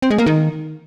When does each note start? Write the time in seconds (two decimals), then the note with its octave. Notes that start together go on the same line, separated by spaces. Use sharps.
0.02 C4
0.10 G#3
0.18 A#3
0.26 D#3